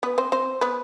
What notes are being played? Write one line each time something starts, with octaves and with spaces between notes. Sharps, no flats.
B3 B4
C4 C5
C4 C5
B3 B4